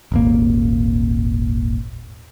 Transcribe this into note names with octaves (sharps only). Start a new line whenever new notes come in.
D#1 G#1 A#3